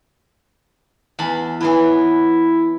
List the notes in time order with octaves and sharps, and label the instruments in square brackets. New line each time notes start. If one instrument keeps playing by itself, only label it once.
[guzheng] E2 A5 B5
[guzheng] E3 F#3 B3 [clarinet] E4